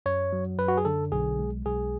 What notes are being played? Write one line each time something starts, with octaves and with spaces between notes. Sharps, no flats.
F#2 C#5
F#3
F#2 B4
F#4
G#4
D3 A4
B1 G#4
G#3
B1 G#4